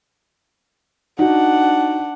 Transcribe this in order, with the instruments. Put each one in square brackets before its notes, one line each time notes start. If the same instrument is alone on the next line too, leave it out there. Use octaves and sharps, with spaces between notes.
[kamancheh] D4 F#5 [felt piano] D#4 F#4